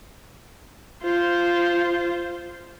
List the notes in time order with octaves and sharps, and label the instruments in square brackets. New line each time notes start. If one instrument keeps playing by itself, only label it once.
[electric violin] F4 C5